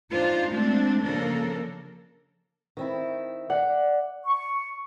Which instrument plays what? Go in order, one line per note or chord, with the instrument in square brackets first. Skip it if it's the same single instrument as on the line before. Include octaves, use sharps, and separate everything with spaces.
[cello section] D4 D#4 F4 C5
G#3 A3 C4 D4
C#3 F3 A#3 D4 A4 A#4
[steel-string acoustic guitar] D#3 C4 E4
[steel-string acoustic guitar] D5 [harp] F#5
[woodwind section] C#6